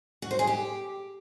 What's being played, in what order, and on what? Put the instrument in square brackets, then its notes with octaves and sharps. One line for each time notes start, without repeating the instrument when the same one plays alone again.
[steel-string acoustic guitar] F#4
C5
G#4
G4